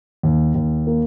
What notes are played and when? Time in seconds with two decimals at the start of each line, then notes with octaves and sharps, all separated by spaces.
0.23 D#2
0.55 D#2
0.87 A#3